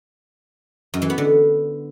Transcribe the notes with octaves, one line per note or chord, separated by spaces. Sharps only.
F#2
E3
B3
D3